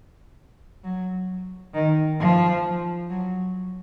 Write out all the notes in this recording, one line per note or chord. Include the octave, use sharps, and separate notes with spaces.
F#3
D#3
F3
F#3